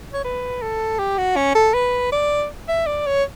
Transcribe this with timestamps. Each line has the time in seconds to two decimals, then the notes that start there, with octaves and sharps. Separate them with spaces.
0.13 C#5
0.24 B4
0.62 A4
0.99 G4
1.18 F#4
1.36 C#4
1.55 A4
1.74 B4
2.12 D5
2.68 E5
2.86 D5
3.06 C#5